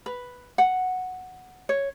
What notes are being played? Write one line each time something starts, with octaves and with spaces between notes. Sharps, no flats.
B4
F#5
C#5